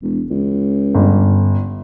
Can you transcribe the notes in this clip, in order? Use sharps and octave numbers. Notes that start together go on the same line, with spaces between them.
E1
C#2
G1